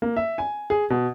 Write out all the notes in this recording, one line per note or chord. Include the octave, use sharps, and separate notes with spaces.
A#3
E5
G#5
G#4
B2